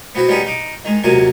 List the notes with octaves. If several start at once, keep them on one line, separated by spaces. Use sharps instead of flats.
B3 C4 E4 F#4 B4
G3 B3 C#4 D#4 G4 G#4
D#4 D6
D#3 G#3
A#1 D#2 C3 F#3 A#4 G#5